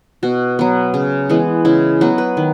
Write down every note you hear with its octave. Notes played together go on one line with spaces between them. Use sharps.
B2 F#4
F#3 B3
C#3
E3 G#3 B3
C#3 E4
F#3 B3 F#4
B4
D#3